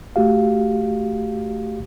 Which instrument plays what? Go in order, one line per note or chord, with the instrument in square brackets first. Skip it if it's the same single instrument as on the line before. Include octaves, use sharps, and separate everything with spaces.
[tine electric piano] A3 F#4 G4 F5